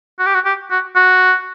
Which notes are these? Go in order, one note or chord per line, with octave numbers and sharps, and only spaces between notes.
F#4
G4
F#4
G4
F#4
F#4